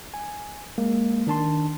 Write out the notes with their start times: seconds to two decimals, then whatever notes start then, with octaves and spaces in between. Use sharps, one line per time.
0.14 G#5
0.78 G#3 A#3
1.27 D#3 D4 A5 C6